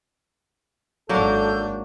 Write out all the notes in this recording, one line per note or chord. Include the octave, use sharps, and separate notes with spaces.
G#1 F#3 A#3 D4 A4 A#4 G6